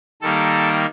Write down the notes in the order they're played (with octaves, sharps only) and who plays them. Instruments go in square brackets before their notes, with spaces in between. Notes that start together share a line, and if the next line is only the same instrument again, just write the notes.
[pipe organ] D#3 G3 A#3 A4